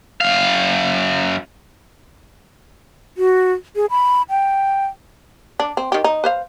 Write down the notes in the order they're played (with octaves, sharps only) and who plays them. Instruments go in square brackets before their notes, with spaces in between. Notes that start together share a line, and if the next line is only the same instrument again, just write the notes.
[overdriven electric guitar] F#2 F5
[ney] F#4
G#4
B5
G5
[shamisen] D4
C4
D#3 G4
D#4
B4 C5 F5